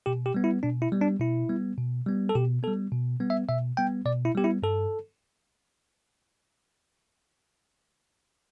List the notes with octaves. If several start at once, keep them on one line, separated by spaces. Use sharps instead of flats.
B2 G4
G4
G3 B3
E4
B2 D4
E4
G3 B3
D4
B2 E4
G3 B3
B2
G3 B3
A4
B2 G4
G3 B3 A4
B2
G3 B3
E5
B2 E5
G3 B3 G5
B2 D5
E4
G3 B3 G4
E4
G2 A4